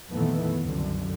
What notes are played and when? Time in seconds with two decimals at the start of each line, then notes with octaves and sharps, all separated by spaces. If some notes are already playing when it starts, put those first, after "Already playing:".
0.12 F2 A#2 D#3 E3 A3 B3
0.62 C2 F#2 D3